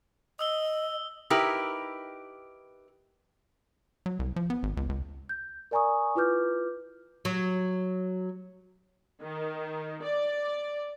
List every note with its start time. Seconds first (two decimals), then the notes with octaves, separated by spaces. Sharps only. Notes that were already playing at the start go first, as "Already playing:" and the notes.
0.39 D#5 D#6 E6 G7
1.30 D#4 E4 G4 A#4 B4
4.06 F#3
4.19 C2
4.36 F3
4.50 B3
4.63 G#1
4.77 C#2
4.89 C#2
5.29 G6
5.71 A#4 D5 G#5 A#5 C#6 D#6
6.15 E4 F4 B4 D6 F6 G6
7.25 F#3
9.22 D#3
10.03 D5